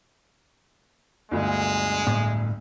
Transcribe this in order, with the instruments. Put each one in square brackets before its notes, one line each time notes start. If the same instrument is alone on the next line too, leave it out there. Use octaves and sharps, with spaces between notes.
[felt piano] G1 D2 G2 [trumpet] G#3
[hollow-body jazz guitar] A2